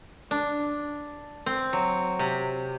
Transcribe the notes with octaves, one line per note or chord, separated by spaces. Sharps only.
D4
C4
F#3
C3